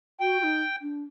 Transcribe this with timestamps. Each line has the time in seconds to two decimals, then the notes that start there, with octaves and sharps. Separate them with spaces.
0.20 F#4 G5
0.40 F#4
0.44 D#4
0.82 D4